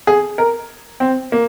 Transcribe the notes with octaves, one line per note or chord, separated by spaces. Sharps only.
G#4
A#4
C4
A#3